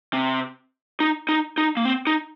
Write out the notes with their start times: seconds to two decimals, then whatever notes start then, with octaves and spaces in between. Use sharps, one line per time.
0.13 C3
1.00 D#4
1.29 D#4
1.58 D#4
1.77 A#3
1.85 C4
2.07 D#4